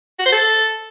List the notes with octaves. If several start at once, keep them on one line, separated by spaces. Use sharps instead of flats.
F#4
C5
A4